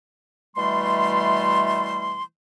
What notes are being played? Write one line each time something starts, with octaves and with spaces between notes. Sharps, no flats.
B2 E3 G3 A3 C6